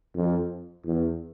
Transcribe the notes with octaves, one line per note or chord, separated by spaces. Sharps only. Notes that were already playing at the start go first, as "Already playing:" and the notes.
F2
E2